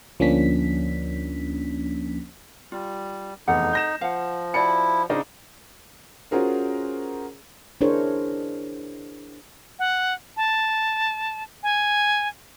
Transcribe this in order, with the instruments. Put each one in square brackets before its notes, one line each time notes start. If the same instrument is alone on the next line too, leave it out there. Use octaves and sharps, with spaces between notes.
[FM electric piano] D2 F3 A#3 C#4 D4 B6
[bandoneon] G3 [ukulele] F4
[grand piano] F1 E2 [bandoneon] D#4 [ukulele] A4 F#5
[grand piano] G6 A#6 E7
[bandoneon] F3 [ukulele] F5 F#5
[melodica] E4 [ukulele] F#4 D5 A5 [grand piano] C#7
[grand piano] C#3 D4 D#4 [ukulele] F4 C5 D#5
[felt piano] C#4 F4 F#4 G#4 A#4 C5
[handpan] D4 E4 G#4 A#4 C5 C#5
[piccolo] F#5
A5
G#5